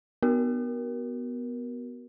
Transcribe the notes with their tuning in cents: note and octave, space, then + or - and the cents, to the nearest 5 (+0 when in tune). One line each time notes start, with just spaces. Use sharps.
B3 +0 F#4 +25 A#4 +20